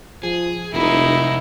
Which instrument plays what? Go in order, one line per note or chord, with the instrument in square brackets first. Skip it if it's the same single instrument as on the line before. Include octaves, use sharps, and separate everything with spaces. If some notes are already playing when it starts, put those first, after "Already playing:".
[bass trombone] F3 [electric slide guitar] G#4
[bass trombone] F1 [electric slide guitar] C3 A#4 [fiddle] D#4 E4